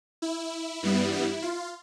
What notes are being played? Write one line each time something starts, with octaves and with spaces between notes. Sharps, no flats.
E4
G2 E3 G3 B3
E4
F4